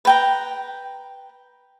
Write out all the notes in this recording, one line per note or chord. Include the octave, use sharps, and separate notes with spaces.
B4 G5 A#5